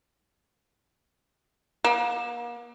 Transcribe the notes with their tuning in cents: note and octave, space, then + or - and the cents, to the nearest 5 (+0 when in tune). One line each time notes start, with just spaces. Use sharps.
A#3 +40